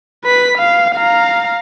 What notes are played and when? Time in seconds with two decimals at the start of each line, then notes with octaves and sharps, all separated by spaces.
0.24 B4 B6
0.58 F5
0.95 F5 A#5